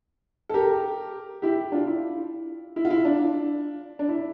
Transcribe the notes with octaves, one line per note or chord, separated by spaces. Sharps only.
A4
G4 A#4
E4 G4
D4 F4
E4
E4
F4
E4
D4
D4
E4